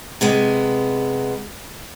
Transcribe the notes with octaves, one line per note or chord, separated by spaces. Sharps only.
C3 G#3 B3